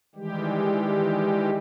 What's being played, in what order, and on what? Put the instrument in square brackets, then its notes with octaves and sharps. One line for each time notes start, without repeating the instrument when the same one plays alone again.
[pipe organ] D#3 E3 G3 G#3 G4